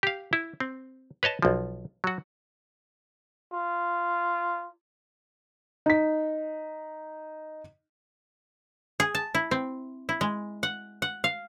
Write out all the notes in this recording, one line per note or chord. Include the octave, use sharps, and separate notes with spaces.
G4 F5
E4
C4
B4 C#5 D#5 A5
B1 F3
F#3 F#4
F4
D#4 B6
G#4
A5
E4
C4
E4
G#3
F#5
F#5
F5